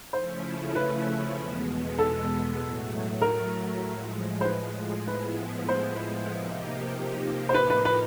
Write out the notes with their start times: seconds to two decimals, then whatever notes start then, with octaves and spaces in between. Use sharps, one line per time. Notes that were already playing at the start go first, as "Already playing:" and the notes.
0.13 C#3 F3 A3 C#4 E4 C5
0.75 B4
1.37 E2 B2 G#3 B3
1.98 A4
2.60 A2 F#3 A3
3.21 A#4
3.84 A2 F3 G#3
4.41 C5
4.45 B4
5.07 A2 F3 G#3 B3 E4 B4
5.69 C5
6.30 C3 F3 A#3 D#4 G4
7.49 C5
7.54 A2 F3 A#3 D#4 B4
7.70 B4
7.85 B4